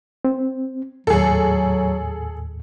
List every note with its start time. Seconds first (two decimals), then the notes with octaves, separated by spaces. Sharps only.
0.25 C4
1.07 D#2 A2 F#3 G#4 A4